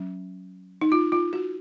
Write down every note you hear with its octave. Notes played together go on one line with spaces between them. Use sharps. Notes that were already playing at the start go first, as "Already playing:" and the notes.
Already playing: F#3 C#4
D#4
F4
F4
F#4